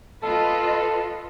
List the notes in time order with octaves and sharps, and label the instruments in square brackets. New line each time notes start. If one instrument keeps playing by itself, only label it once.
[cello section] F4 B4 D#5 [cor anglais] A4